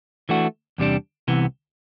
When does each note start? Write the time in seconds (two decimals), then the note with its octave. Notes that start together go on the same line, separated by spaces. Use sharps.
0.29 E3 A3 D4 F#4
0.78 E2 C3 G3 D4
1.28 C2 C3 E3 B3